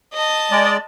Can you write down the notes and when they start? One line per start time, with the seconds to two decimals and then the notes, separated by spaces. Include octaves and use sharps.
0.14 D#5 A5
0.51 G#3 D5